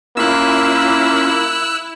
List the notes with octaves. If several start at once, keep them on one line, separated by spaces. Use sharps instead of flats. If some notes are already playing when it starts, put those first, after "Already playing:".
A#3 C#4 E4 F4 E5 E6 F#6